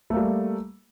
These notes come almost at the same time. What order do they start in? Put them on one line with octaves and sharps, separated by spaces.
A3 A#3 G3